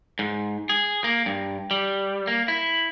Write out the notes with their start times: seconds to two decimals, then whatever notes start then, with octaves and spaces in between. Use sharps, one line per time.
0.19 G#2
0.69 G#4
1.04 A#3
1.26 G2
1.71 G3
2.27 A#3
2.48 E4